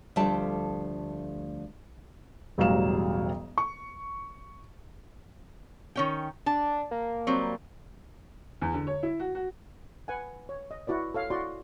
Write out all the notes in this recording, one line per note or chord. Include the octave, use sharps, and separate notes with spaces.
D2 F3 G3 A3 E5 A5
E1 A1 F#3 G3 F5 E7
C#6
D#3 C#4 G5
D4 A5
A#3
F#3 G3 C4
E2
D3
C#5
E4
F#4
F#4
B4 F#5 G#5
C#5
D#5
E4 F#4 B4 D5
A4 C#5 F5
E4 F#4 D5 C6